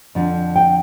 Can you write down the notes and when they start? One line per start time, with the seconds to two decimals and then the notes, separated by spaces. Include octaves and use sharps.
0.15 F2 D3 F3
0.56 G5